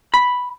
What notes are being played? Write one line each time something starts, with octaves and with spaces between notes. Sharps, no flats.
B5